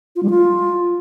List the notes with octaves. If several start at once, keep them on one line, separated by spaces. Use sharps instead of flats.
F4
G3
F4